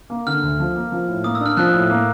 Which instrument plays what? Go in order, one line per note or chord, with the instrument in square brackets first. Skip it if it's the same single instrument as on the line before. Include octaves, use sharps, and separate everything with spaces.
[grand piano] A#3
[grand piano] D3 [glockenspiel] F6
[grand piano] D2
F3
A#3
F3
A2
[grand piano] A#3 [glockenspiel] D#6
[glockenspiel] E6
[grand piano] D4
[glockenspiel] F6
[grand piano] F3 [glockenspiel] F#6
[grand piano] A2
A#3